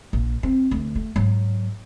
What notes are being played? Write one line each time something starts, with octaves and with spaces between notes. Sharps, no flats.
A#1
C4
D2
A3
G#2 F#3